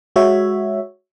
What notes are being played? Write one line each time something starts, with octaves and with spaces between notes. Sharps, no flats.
G#3 F#4 C#5 E5